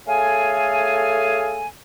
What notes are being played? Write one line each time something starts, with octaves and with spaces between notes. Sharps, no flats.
A3 G#4 A4 C#5 F5 G#5